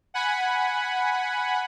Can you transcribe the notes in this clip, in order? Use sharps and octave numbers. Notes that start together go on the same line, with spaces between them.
F#5 G#5 B5